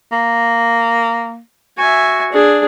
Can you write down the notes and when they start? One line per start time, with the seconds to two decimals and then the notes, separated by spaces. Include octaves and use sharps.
0.12 A#3
1.78 F#4 E5 G#5
2.32 D4 G#4